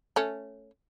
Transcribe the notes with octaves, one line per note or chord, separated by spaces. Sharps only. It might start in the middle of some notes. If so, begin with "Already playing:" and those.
A3 C#4